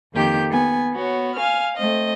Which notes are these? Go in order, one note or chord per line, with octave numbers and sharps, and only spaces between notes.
F2 D#3 A#3 G4 G6
B3 G#5
B3 F#4 C#5
F5 G#5 F6
A3 C4 D#5